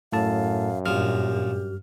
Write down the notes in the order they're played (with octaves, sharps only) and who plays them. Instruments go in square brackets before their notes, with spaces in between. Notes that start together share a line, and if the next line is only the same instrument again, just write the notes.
[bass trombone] F#2 [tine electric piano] A2 A4 A5 [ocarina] F5
[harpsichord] A#1 F3 [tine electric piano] G2 F6 [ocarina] G4